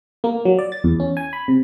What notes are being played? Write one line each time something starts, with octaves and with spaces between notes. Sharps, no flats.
A#3
F#3
D5
A6
E2
C#4
G#5
B5
C3